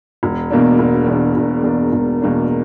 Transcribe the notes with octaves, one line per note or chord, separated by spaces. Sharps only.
E1
E2 B2 A#3 D4
E1
E2 B2 A#3 D4
E1
E2 B2 A#3 D4
E1
E2 B2 A#3 D4